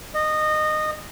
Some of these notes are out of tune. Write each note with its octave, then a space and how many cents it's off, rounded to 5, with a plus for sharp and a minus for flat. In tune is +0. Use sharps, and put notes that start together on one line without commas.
D#5 -20